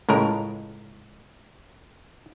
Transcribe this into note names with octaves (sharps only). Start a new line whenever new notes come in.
C#2 A2 G#3 A#4